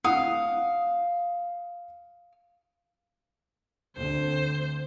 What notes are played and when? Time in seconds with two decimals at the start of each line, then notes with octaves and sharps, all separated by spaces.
0.04 F5 F#5 D#6
3.97 D2 D3 C4 C5